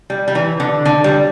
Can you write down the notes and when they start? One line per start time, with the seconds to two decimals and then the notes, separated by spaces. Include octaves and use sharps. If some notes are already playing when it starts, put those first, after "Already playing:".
0.10 G3
0.28 G3
0.35 E3
0.60 D3
0.85 D3
1.04 G3